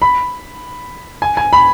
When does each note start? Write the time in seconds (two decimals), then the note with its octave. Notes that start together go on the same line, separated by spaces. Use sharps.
0.02 B5
1.22 G#5
1.37 G#5
1.53 B5